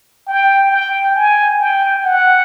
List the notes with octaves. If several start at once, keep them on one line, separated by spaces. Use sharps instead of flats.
G5
G5
G#5
G5
F#5